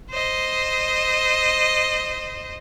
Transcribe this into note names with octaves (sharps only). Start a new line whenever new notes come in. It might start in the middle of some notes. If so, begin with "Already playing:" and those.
C5 D#5